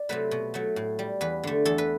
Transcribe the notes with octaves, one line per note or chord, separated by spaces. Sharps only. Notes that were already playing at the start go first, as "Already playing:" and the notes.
Already playing: D5
C3 F#3 A3 B4
B2
F#3 A3
A2
G3
E2 B4
D3 A3
E2 A4
B4